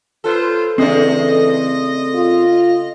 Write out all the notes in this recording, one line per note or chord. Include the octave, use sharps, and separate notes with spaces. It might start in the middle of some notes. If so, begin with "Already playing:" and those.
F4 A4 B4 C5
C#3 E3 A3 C4 G#4 D5 D#5
F4